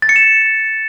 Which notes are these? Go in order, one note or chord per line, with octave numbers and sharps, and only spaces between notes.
A6
C#7
E7